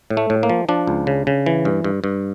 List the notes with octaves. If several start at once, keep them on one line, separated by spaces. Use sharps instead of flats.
A2
A3
A2
A#3
F3
F3 D4
C#2
C#3
C#3
E3
G2
G2
G2